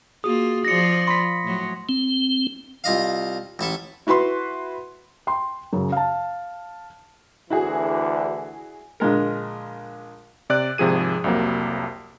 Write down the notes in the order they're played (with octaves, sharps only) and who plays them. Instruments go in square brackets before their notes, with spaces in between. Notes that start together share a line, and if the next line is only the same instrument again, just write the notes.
[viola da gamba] A#3 F4 [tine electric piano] F#4 G#4 [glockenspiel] D#6
[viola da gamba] F3 F4 D5 [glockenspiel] A#6 C#7
[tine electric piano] B5 B6 [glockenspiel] C6
[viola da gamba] A2 F#3
[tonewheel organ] C4
[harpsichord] C2 F4 D#5 F5
A1 E4 A4 E5
[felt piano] E4 F#4 B4 B5 C6
G5 C6
F#2 C#3
F5 A5
[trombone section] D2 D3 E3 [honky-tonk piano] E4 F#4 G#4
[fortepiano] A#1 D3 G#3 A#4
[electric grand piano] C3 D5 F#6
G#1 C3 F3 G#4 D#7
C2 F2 C3 F#3 A#3